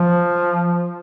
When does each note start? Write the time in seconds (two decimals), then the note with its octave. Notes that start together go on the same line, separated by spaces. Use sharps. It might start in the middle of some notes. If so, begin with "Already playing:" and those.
Already playing: F3